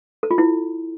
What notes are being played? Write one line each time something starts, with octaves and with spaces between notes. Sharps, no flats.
A4
F4
E4